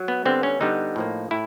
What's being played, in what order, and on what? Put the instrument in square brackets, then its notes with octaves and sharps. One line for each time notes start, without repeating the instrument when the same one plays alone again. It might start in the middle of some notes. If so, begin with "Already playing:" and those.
Already playing: [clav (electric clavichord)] F#3
B3
D3 G3 B3 C4
C#4
D3 G3 B3 D#4
A2 F3 A#3
A2 E4